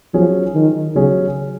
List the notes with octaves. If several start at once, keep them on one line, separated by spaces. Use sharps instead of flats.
F3 F#3 C#4 G#4
D#3
C#3 F#3 C#4 G#4